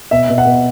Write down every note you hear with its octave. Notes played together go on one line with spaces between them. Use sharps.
B2 E5
B2
F#5
B2